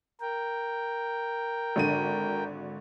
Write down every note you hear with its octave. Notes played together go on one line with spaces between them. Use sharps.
A#4 G5
G#1 D3 D#7